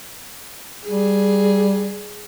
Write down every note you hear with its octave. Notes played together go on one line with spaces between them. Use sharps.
G3 G#4